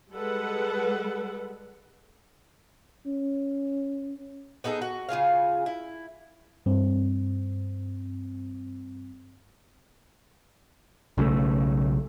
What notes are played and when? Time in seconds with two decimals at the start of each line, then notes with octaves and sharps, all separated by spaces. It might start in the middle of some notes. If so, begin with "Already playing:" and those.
0.13 G3 G#3 A4 B4 F#5
3.06 C#4
4.64 B3 D#4 G#4 A4
4.82 F#4
5.09 C#3 F4 G#4 F5
5.66 E4
6.66 G2 C4
11.18 B1 C#3 E3 A3